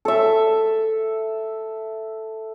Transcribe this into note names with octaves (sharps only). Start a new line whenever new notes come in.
A4 E5